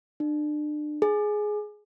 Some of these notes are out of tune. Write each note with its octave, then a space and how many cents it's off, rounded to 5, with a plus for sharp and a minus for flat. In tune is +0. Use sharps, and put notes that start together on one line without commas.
D4 +35
G#4 +10